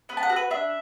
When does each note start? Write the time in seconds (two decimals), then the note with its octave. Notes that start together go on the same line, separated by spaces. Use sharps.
0.09 B3 B4
0.17 A5
0.23 F#5
0.30 F#4 A4
0.36 B4
0.51 D4 E5